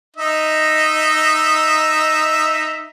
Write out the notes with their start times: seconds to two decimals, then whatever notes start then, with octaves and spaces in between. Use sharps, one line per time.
0.17 D#4 D#5 E5